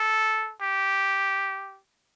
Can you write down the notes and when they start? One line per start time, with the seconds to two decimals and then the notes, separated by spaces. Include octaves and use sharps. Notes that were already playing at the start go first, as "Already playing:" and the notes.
Already playing: A4
0.61 G4